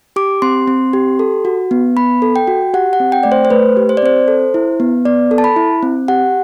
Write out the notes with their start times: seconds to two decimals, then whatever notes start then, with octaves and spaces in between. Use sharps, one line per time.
0.16 G4 D6
0.42 C4 C6
0.68 C4
0.93 G4
1.19 A4
1.45 F#4
1.71 B3
1.97 B3 B5
2.22 A4
2.36 G5
2.47 F#4
2.74 G4 F#5
2.93 F#5
3.00 C4
3.12 G5
3.23 A3 D5
3.32 C5
3.45 C5
3.50 A3 B4
3.77 G4
3.89 C5
3.97 D5
4.02 C4 C5
4.28 A4
4.54 E4
4.80 B3
5.05 B3 D5
5.31 A4
5.38 A5
5.44 B5
5.56 E4
5.83 C4
6.08 G4 F#5